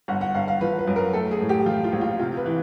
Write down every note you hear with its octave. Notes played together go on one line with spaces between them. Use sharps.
G1 F#5
F#5
G1 F5
F5
F3 B4
B4
F#2
A#4
A3 A4
G#4
A2
G4
F3 F4
F4
A#1
F4
C3 F4
B4
E3